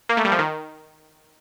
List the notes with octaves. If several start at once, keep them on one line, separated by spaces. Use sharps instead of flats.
A#3
A3
G3
F3
D#3